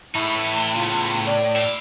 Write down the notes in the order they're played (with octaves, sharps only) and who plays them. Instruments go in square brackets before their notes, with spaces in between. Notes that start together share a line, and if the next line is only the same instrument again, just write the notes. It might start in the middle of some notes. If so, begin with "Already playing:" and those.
[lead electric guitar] A2 [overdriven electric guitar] D#4 G#4 [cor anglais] E4
[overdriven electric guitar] A3 B4
[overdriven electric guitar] C#3 B3 [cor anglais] F4
[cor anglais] D5
[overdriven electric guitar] E4 F5